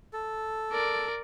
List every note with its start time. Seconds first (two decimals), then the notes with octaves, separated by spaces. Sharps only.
0.13 A4
0.72 A#4 D5